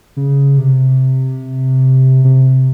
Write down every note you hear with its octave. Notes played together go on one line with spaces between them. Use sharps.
C#3
C3
C3